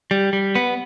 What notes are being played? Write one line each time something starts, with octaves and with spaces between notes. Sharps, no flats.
G3
G3
B3